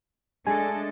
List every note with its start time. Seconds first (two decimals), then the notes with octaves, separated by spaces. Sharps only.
0.47 G#3 A3 D4 A4 D#5 G#5